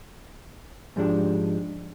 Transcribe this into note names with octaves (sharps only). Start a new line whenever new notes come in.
G#2 F3 G#3 D4 G4